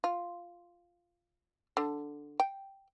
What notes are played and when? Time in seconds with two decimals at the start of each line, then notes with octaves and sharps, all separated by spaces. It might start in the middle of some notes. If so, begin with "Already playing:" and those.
0.04 F4
1.77 D3
2.40 G5